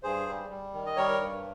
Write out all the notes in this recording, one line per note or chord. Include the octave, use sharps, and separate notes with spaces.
G2 G#4 C5
G3
G3
D#3
D#5
G3 A#4 C#5
G2